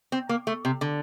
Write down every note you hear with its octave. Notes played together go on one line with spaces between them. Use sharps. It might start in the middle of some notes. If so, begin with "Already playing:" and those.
C4
A#3
A3
C3
D3